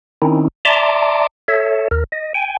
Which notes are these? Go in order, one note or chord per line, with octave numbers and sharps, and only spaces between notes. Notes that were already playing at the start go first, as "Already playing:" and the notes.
D#3 C4 C#4 D#4 E4
D5 E5 A5 A#5 C6 D6
A4 C#5 E5
D#2 A#4
D#5
G5 G#5